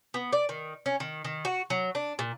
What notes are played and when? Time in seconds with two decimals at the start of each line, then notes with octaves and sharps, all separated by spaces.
0.14 B3
0.33 D5
0.49 D#3
0.86 C#4
1.00 D#3
1.25 D#3
1.45 F#4
1.70 F#3
1.95 D4
2.19 A#2